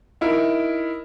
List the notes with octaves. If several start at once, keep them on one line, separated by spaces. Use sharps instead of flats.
D#4 E4 A#4